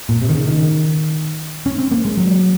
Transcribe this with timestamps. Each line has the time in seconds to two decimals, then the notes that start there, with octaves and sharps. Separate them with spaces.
0.09 A#2
0.22 C3
0.29 D#3
0.35 C#3
0.47 D#3
1.66 C#4
1.78 C4
1.91 A#3
2.05 G#3
2.17 F#3